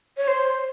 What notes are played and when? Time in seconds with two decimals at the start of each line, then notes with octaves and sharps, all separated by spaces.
0.17 C#5
0.28 C5